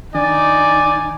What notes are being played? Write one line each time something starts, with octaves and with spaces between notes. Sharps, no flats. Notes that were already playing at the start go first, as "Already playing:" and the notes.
D#3 D4 D#4 D5 G#5